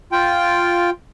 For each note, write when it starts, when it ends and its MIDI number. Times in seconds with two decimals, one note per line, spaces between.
0.12 0.90 65
0.12 0.90 79